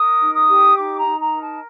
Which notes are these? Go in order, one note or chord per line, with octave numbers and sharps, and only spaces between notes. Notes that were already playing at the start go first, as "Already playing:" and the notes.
Already playing: A#4 D#6
D#4
D#6
G4
D#4 D6
A#5
D#4
A#5
A#4
A5